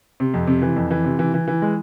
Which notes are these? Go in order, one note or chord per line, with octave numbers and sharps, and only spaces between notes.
C3
F2
C3
E3
F2
E3
C3
E3
E3
E3
G#3